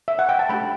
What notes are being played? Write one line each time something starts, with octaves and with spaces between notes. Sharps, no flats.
E5
F#5
G5
A5
A3 D4 G4 G5 B5